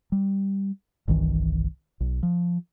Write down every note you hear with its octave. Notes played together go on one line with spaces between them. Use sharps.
G3
G1 C2 D#3 E3
B1
F3